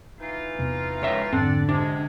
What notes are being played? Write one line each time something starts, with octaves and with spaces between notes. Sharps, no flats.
E3 D#4 F4
E2 C3 B3
C#2 C#5 E5
F2 G#2 D3 C4 A4 D5 F#5
C3 G#3 D4